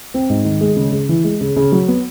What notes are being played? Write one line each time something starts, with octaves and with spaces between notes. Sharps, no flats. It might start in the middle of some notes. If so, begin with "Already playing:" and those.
C4
G#2
D#3
G#3
C#3
C#3
E3
G#3
C#3
C#3
F#3
B3